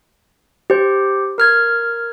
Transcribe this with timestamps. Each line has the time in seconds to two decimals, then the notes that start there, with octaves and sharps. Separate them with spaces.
0.70 G4 C5
1.38 A#4 F6 G#6